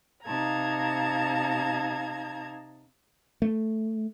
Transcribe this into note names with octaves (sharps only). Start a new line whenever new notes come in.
C3 D#4 F5 A5 A#5 G#6
A3